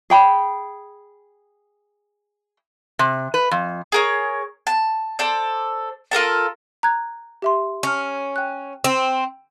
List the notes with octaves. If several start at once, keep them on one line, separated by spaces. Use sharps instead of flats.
G#4 G5 B5
C3
B4
F2
G#4 A#4 C#5
A5
A4 C5 D5
F4 A4 A#4 A5
A#5 F#6 G#6
G4 E5 C6
C#4 C#6 F6
G5 F#6
C4